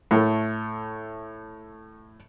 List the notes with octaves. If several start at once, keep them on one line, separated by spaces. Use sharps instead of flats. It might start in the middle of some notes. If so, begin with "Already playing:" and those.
A2 A3